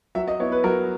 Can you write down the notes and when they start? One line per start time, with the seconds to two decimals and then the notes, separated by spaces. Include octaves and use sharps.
0.15 F#3 E5
0.28 D#5
0.40 B3 E4 C#5
0.52 B4
0.64 F#3 A#4